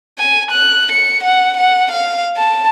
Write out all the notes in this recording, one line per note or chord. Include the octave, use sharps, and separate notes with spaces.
G#5
F#6
C#7
F#5
F#5
F5
A5